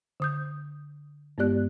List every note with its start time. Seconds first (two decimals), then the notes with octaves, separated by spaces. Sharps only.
0.20 D3 D#6 G6
1.38 G2 G#3 B3 G4 D5 F#6